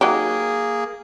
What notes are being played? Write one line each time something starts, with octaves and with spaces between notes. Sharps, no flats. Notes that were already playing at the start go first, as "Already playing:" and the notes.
F#3 A#3 D#4 G4 G#4